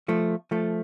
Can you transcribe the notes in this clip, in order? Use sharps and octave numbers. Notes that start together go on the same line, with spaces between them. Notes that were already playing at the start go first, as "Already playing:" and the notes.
F3 A3
F3 A3